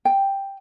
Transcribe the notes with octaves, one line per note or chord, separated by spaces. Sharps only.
G5